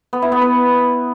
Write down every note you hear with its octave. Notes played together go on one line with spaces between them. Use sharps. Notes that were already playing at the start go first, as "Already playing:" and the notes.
B3
E4
B3
B4